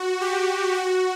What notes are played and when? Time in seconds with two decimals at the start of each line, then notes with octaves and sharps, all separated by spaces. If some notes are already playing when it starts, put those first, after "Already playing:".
Already playing: F#4
0.21 G4
0.74 F#4